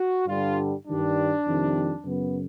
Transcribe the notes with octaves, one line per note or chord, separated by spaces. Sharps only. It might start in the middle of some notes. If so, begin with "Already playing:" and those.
Already playing: F#4
G2 D3 G3 F4
G2 D#3 G3 D4
F2 C3 D#3 G3
F#2 C#3 F#3 B3